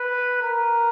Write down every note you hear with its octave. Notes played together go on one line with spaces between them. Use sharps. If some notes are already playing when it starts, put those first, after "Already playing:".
Already playing: B4
A#4